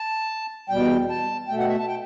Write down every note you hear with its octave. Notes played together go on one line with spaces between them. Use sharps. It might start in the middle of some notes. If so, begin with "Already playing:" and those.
Already playing: A5
E2 B2 G3 G5
A5
B2 A3 G5
F#5
E5
A5
G5